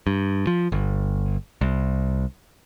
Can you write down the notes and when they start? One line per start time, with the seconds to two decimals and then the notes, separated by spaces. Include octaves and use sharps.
0.07 G2
0.47 F3
0.72 G1
1.61 C2